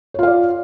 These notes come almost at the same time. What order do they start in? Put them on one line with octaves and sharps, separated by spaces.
C#5 F4 F5 D5